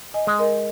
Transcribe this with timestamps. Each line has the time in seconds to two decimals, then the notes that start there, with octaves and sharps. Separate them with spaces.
0.14 D#5 G#5
0.27 G#3
0.39 A#4 D#5